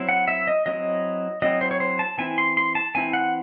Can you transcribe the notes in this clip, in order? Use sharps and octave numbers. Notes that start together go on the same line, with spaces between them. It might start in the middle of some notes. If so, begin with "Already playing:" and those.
Already playing: F#3 C4 E4
F#5
E5
D#5
F#3 C4 E4 D#5
F#3 C4 E4 D#5
C5
C#5
C5
A5
E3 C4 E4 G#5
C6
C6
A5
E3 C4 E4 G#5
F#5